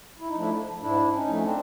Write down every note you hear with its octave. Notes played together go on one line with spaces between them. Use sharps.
E4
D#4
F3 A3 D4 E4
G#2 D4 E4
C#4 D#4
F3 A3
C#4
C4 D4